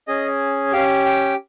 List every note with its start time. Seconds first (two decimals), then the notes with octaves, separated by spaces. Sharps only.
0.08 C#4 G#4 D#5
0.72 C#4 G4 F5
1.06 G5